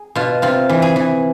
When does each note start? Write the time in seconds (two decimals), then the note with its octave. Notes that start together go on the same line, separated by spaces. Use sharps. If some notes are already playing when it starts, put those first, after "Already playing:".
Already playing: G#4
0.15 B2 F4
0.42 C3 F4
0.69 E3
0.82 G#4
0.96 E3